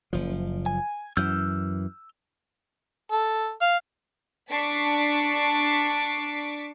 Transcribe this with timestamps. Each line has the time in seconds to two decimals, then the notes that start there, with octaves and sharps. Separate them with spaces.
0.13 F#1 F3
0.66 G#5
1.17 F#2 E3 E6 F6 G6
3.11 A4
3.61 F5
4.51 D4 A5 C#6 D6 B6 C7